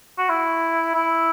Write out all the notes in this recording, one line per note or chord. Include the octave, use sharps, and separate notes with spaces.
F#4
E4
E4